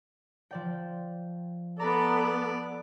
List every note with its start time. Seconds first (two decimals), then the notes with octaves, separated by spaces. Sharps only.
0.51 F3 D5 G5
1.80 B3 A4 D5 A#5 B5